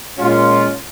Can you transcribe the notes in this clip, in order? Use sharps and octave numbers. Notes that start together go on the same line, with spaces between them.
A#2 G#3 C#4 F4